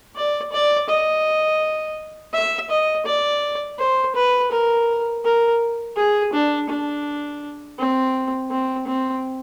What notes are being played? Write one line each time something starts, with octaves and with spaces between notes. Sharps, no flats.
D5
D5
D#5
E5
D#5
D5
C5
B4
A#4
A#4
G#4
D4
D4
C4
C4
C4